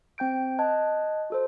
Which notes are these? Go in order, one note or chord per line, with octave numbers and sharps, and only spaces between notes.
C4 G5 G6 D7
D#5 A5 F#6 G#6
F#4 A4 C5